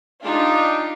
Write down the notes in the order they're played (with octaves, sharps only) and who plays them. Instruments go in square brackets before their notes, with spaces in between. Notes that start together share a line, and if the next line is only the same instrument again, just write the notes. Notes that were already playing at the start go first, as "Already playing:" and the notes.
[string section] D4 D#4 F4 G4